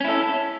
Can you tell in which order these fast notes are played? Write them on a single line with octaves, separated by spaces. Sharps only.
C#4 E4 A4